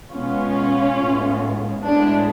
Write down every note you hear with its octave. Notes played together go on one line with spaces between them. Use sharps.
B2 G#3 B3 C#4 F4
A2 G#3 B3
A2 G#3 B3 D4